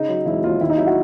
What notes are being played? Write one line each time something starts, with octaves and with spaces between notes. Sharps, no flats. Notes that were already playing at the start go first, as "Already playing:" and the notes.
Already playing: C#3 D#4
F#3
E1 E4
D#2 F4
D#3 E4
D#4
F#3 E4
F#4